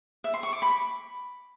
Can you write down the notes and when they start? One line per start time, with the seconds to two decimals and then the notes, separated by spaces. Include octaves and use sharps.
0.24 E5
0.34 C6
0.43 C#6
0.53 D6
0.62 B5